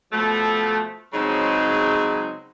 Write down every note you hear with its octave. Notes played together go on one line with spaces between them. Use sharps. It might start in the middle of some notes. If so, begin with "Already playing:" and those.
B2 F3 A3
C#3 F#3 G#3 C4 D#4